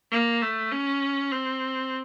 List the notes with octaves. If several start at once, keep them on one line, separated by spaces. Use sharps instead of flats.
A#3
A3
C#4
C4